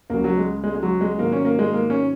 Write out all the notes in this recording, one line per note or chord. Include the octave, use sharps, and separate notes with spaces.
C#2 C#3 F#3 A#3
F#3
G#3
G#3
G#3
F#3
G#3
G#2 D#3 F#3 A#3
C#4
A#3
G#3
A#3
C#4